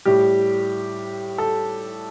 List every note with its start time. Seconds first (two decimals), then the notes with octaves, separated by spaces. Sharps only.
0.05 A2 G3 G4
1.38 A4